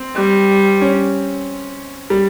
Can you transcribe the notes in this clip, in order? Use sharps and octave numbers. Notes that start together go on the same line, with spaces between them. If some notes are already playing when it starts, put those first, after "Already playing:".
Already playing: C4
G3
C#4
G3